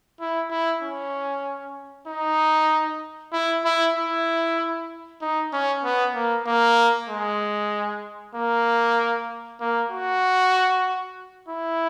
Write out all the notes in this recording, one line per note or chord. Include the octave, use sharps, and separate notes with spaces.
E4
E4
C#4
D#4
E4
E4
E4
D#4
C#4
B3
A#3
A#3
G#3
A#3
A#3
F#4
E4